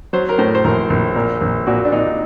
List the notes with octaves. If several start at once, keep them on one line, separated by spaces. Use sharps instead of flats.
F#3 C5
A#4
A2 C5
C5
A#1 A#4
A#1
A#2 A#4
A#1
A#2 F#4
D4
A#2 D#4